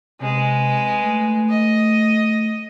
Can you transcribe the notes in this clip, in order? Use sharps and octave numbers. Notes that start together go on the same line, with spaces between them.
C3 G#3 B4
A3
D#5